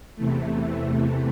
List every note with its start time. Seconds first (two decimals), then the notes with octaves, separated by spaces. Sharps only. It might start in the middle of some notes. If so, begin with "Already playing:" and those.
0.16 E2 C3 E3 A3